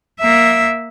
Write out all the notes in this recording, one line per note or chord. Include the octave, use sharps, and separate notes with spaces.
A#3 E5